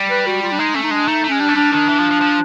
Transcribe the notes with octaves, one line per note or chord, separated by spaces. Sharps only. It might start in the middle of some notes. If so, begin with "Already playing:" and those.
Already playing: G3
B4
F#4
F4
D4
G#3 D#4
A3 C#4
D#4
G#3 D4
A3 D#4
A3
G#3 C#4
G3 D4
A3
G3 D4
D#3 D4
E3
F3
F3
F3